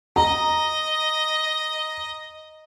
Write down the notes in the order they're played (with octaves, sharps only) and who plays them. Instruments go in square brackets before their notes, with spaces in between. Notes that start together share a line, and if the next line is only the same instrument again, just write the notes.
[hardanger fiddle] D#5 [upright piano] A#5